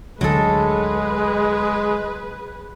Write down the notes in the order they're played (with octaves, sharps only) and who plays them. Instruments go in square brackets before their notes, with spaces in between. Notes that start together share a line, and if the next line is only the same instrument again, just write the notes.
[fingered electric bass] D2 D3 D4 [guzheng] F#3 A4 [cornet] G#3 [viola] G#4 B4